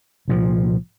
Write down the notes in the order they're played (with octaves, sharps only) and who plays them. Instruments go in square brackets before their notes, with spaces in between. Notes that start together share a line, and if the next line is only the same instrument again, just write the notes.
[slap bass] C2 A#2 F3